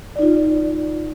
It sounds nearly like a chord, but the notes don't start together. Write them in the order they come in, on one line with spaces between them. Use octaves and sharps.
D5 D#4 F4